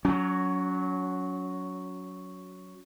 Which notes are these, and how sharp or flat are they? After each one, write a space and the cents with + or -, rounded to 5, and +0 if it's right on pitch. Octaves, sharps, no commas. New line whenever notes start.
F#3 +0 C#4 +30